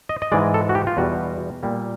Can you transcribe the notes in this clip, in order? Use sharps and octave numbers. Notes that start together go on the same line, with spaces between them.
D#5
D#5
G#2 E3 G#3 D5
A4
F#4
G4
F4
E2 B2 G3 F#4
A#2 G3 A#3